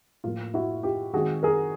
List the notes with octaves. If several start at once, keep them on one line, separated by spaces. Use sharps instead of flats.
A2 F3 A#3 F4
E4 F#4
F4 G4
D#3 G#3 C4 F#4 G#4
G#4 A#4